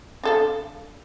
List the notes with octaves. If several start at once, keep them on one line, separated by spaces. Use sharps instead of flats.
D4 A4 F5